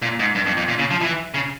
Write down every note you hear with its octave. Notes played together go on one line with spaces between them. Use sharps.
A#2
G#2
G2
F2
F2
A#2
C#3
F3
E3
C#3